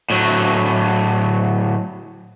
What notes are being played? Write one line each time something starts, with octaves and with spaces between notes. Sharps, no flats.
A2 F#3